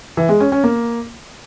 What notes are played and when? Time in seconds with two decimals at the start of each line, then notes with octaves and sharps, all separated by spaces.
0.17 E3
0.29 G#3
0.40 C#4
0.52 C#4
0.64 A#3